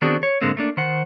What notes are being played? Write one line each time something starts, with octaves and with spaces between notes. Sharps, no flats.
D#3 B3 C4 D4 F#4 G#4
C#5
G#2 D3 G#3 A#3 C4
A3 A#3 D4
D#3 C5 F#5